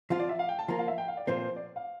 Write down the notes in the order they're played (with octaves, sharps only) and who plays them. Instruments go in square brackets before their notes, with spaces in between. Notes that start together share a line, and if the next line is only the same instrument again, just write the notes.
[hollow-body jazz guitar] F3 C4 F4 [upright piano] F5
[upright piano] D5
E5
F5
G5
A5
[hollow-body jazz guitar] F3 A#3 F4 [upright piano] A#5
[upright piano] F5
E5
G5
F5
D5
[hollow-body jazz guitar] A#2 F3 C4 [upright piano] C5
[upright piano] D5
F5